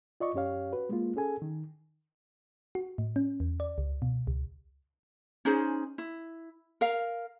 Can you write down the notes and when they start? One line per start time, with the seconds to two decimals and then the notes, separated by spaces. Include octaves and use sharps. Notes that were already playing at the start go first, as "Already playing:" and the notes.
0.20 F4 D5 D#5 C#6
0.34 F#2 C#4 G4 C#5 F5
0.73 F#4 B4
0.89 G#3 A#3 F4
1.16 C#4 G#4 A4 G#5
1.42 D#3
2.75 F#4
2.98 A2
3.16 C#4
3.40 E2
3.60 D5
3.78 C#2
4.02 B2
4.27 C#2
5.45 C#4 D#4 G#4 C5
5.98 E4
6.81 A#4 F5